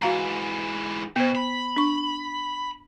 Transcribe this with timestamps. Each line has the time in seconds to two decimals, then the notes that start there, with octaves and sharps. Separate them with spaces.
0.02 G#2 E3 F#4 F5 A#5
1.16 B2 B3 C5
1.35 B5
1.76 D4 C#6